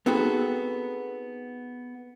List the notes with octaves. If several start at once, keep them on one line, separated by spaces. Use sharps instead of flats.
B3 C4 D#4 F#4 G#4 A4